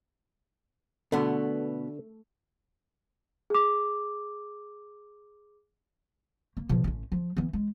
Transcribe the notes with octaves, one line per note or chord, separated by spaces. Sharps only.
B2 D3 A3 B3
G#4 D6
A#3
B2 F3
A1 C#4
F3
E3 B3
G#3